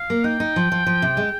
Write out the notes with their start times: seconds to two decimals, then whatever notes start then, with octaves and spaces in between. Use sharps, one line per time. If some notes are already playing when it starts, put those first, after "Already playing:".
Already playing: F5
0.10 A#3
0.24 D#4 G5
0.40 D#4
0.56 F3
0.72 F3
0.86 F3
1.02 C3
1.17 G#3